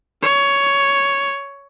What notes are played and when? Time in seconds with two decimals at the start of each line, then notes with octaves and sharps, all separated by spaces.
0.22 C#5